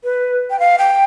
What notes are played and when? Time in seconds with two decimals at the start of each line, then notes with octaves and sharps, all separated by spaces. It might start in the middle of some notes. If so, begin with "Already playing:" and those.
0.04 B4
0.50 G5
0.60 F5
0.78 G5